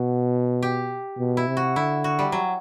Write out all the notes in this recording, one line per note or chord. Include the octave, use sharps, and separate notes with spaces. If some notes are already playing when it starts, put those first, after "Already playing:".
Already playing: B2 F#4
G4
B2
E4
C3
F#4
D3 E4
F#4
G3
F#3